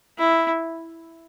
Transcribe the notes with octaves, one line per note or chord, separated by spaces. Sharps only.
E4